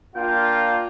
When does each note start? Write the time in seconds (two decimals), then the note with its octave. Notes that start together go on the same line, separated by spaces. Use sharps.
0.16 A#3 D4 F4 G5